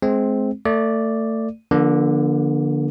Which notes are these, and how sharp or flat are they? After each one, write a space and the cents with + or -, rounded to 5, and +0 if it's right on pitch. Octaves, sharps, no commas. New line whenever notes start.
G#3 +25 C4 +0
A3 +25 D5 +0
D3 +0 F3 -15 A#3 +40